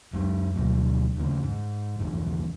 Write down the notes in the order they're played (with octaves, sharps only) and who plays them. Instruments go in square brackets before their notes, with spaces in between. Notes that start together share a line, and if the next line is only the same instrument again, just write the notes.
[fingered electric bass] F#2 G#3
D2 B2 F#3
D#2 C#3
G#2
A#1 E2 G2